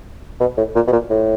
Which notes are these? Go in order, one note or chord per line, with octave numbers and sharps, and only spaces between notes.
B2
A2
A#2
B2
A#2
A2